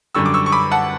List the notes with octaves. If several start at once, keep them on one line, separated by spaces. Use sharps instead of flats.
F#2 D3 G3 C#6 E6
D6
C#6 E6
C#6
B5 D6
F#5 A5